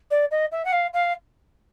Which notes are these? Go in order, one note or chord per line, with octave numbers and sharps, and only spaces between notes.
D5
D#5
E5
F#5
F5
F5